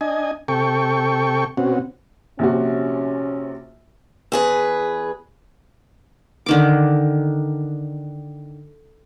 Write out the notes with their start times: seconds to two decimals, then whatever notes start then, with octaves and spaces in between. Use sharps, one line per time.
0.01 D4 D#5 G#5
0.48 C3 A4 G5 C#6
1.57 B2 C4 C#4 F#4
2.39 A#1 C3 C#4 F#4
4.32 E2 G#4 B4
6.46 D3 D#3 D6